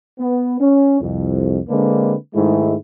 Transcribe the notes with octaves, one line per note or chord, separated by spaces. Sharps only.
B3
C#4
C2 F2
D3 G#3 A#3 C4 D4 B4
G#2 D#3 G#3 A3 E4